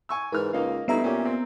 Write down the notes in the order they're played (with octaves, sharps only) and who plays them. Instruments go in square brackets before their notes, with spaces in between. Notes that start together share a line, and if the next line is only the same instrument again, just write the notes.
[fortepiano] G#5 C#6 E6
[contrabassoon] G#2 [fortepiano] E3 F6 [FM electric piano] A#4 B4
[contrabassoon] C#2 [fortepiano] A#3 D#4 F5
[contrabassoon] G2 [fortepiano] A3 D#4 E4 [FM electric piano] B3 E5 A#5
[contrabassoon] A#2 [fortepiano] C#4 G4
[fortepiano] C4